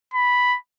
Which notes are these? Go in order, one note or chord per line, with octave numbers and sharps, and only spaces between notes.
B5